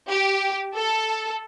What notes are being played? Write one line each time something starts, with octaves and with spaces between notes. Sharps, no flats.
G4
A4